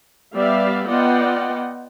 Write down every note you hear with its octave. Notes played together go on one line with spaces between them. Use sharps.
G3 B3 D5 E5 F5
B3 F4 D5 D#5 F#5 G5